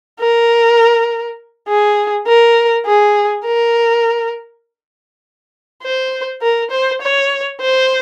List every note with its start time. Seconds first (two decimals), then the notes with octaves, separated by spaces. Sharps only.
0.20 A#4
1.68 G#4
2.28 A#4
2.86 G#4
3.45 A#4
5.83 C5
6.42 A#4
6.71 C5
7.02 C#5
7.61 C5